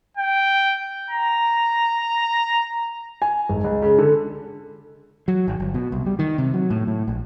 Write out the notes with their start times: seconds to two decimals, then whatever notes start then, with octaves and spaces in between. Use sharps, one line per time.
0.17 G5
1.11 A#5
3.22 G#5
3.49 G#1
3.64 C#2
3.82 C#3
3.99 D3
5.28 F#3
5.48 G#1
5.60 G1
5.74 B2
5.92 C2
6.06 G3
6.19 D#3
6.38 C3
6.54 F#3
6.70 A2
6.87 A2
7.08 A#1